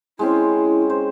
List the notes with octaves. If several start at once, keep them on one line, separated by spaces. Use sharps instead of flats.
G#3 C4 C#4 E4
C5